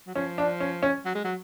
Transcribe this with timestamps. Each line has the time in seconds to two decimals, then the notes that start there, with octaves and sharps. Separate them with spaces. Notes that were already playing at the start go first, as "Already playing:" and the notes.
0.07 F#3
0.15 F3 C#4
0.38 D4
0.60 C#4
0.83 C#4
1.05 F#3
1.15 G#3
1.24 F#3